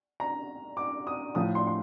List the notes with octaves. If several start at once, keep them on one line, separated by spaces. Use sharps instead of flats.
A#5
D6
D#6
A2 F3 D#6
C6
C6